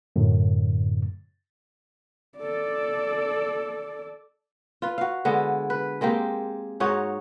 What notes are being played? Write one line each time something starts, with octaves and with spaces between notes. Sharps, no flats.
F#2 A2 D3
A4 D5
F4 B4
F#4 F5
D3 G#3 B3
B4
G#3 A#3 C4 G4
G#2 D#4 F#4 C#5